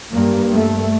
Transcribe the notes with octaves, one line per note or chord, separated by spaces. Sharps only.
G2 A#3
A3